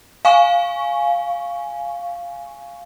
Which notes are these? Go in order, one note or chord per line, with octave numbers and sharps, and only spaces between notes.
F5 G#5 C#6